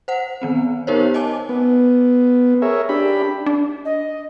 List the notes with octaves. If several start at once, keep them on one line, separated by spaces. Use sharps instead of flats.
C5 F#5
D#3 B3 C4
B3 D#4 G4 A#4 C5 C#5
D#5 G#5 A5 D6
B3
G#4 A#4 C#5 E5
D4 G4 B5
D4
D#5